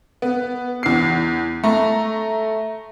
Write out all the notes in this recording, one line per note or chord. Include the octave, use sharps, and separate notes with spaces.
B3
E2 C7
A3 A#5 C#6